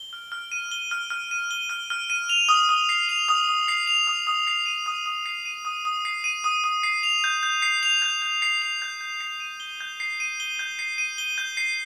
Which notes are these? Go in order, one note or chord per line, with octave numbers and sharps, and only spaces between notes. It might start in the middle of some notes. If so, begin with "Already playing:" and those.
Already playing: G7
F6
F6
D#7
G7
F6
F6
D#7
G7
F6
F6
D#7
F7
D#6
D#6
C7
F7
D#6
D#6
C7
F7
D#6
D#6
C7
D#7
D#6
D#6
C7
D#7
D#6
D#6
C7
D#7
D#6
D#6
C7
F7
G6
G6
C7
F7
G6
G6
C7
F7
G6
G6
C7
D#7
G7
G6
C7
D#7
G7
G6
C7
D#7
G7
G6
C7